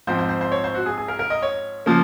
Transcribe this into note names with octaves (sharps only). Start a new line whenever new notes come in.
G#2 F3 C4 C5
C5
C5
C5
C#5
C5
F#4
G#4
G#4
A#4
A#4
D#5
C#5
C#3 F3 A#3